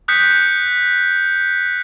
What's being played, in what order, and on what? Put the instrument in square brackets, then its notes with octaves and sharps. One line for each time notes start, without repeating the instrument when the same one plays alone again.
[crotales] D#6 F#6 G6 B6 C#7